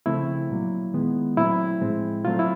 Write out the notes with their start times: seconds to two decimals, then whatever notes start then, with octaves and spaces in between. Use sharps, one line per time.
0.06 C#3 F3 A3 C4 E4
0.50 A#2 F#3 A#3
0.94 D#3 G#3 B3
1.37 A#2 F#3 A3 C4 E4
1.81 A2 F3 G#3 C4
2.25 A#2 F#3 A3 C4 F4
2.39 E4